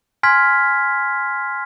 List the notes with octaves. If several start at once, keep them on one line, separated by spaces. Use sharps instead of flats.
G#5 C6 F6 G#6 B6